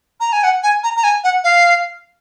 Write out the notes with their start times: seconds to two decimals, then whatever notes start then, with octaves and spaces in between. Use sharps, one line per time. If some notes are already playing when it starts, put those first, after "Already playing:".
0.20 A#5
0.33 G#5
0.44 F#5
0.63 G#5
0.84 A#5
0.97 A#5
1.04 G#5
1.24 F#5
1.44 F5